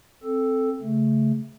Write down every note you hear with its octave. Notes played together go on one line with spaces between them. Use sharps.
C4 A4
C#3 A3